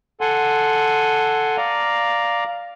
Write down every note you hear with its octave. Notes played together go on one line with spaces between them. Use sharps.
A4 F#5 G#5 C6
D5 F5 A#5